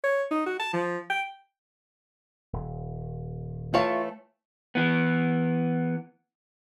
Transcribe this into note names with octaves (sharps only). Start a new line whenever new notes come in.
C#5
D#4
F#4
A5
F3
G5
D#1
E3 A3 F4 C#5 F5
E3 B3